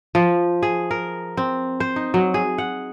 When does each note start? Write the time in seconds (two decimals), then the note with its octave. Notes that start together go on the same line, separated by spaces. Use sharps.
0.15 F3
0.63 G#4
0.91 A#4
1.37 C4
1.80 C5
1.96 D#4
2.14 F#3
2.34 G#4
2.58 F#5